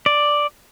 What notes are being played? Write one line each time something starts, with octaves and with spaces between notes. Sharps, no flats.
D5